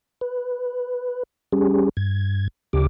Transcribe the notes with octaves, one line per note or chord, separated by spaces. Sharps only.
B4
G3 C#4 G4 G#4
G2 G#6
D2 C#3 G4 D6